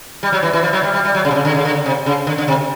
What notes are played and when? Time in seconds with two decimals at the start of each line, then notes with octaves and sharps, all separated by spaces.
0.23 G3
0.32 F#3
0.43 E3
0.53 E3
0.63 F3
0.73 F#3
0.83 G3
0.93 G3
1.05 G3
1.15 F#3
1.25 C#3
1.31 C3
1.35 C#3
1.45 D3
1.55 C#3
1.65 D3
1.86 C3
2.06 C#3
2.27 D3
2.38 D3
2.48 C3